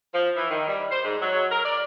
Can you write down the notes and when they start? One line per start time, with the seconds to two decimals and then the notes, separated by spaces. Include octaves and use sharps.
0.14 F3
0.36 E3
0.50 D#3
0.67 G3
0.91 C5
1.04 G#2
1.22 F#3
1.51 A#4
1.65 D5